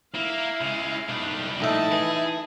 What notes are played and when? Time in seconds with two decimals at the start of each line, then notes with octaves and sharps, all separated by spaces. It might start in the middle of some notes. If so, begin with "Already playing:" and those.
0.15 A#3 E4 F5
0.61 C#3 G#3
1.09 C2 D4 D#4 B4
1.60 A#1 A2 D#4 E4 E5 A5
1.92 E3 G#4